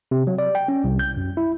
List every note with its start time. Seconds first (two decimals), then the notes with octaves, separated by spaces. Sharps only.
0.11 C3
0.27 F#3
0.39 D5
0.55 G5
0.68 C#4
0.84 C2
0.99 G6
1.17 F#2
1.37 E4